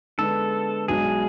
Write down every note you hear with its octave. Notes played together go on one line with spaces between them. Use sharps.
D3 G#3 B3 D4 A4
B1 B2 G#3 D4 G#4